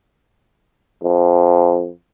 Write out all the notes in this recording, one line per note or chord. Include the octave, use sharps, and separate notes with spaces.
F2